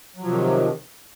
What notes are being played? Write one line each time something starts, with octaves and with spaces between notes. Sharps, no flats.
C3 D#3 F3 F#3